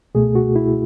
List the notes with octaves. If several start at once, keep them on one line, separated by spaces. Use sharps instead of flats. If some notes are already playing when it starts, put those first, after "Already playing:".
C#2 B2 A3 G#4
F#4
E4